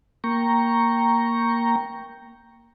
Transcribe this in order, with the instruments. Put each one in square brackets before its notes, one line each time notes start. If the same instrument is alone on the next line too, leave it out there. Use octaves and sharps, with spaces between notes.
[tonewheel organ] A#3 G5 A#5 C#6